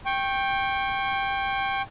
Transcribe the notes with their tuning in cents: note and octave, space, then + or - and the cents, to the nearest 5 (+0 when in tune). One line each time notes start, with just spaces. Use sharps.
G5 +5 C#6 -25